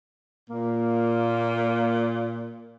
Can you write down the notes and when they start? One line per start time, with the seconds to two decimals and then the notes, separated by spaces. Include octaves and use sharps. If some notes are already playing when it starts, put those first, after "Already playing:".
0.49 A#2 A#3